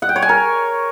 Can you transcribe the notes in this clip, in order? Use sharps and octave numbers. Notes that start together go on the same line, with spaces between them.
F#5
G5
C#5
G#5
A#4